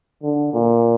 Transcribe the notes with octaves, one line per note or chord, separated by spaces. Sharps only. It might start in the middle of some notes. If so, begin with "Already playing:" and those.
D3
A#2